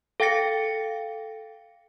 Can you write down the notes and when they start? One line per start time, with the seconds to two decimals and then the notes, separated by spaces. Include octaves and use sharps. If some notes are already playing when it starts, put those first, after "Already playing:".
0.20 A4 F5 G5 A6 A#6 C#7